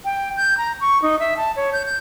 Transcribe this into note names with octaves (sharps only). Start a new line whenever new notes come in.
G5
G6
A#5
C#6
D#4
E5
A5
C#5
G6
G6